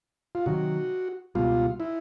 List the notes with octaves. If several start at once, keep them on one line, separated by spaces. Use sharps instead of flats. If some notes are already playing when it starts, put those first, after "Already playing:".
F4
C3 D#3 F#3 F#4
C#2 B2 G3 F4
E4